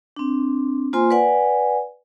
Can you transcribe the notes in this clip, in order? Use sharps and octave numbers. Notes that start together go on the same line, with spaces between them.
C4 D4
A#3 F4 C5 G#5 C6
B4 D5 F#5 G#5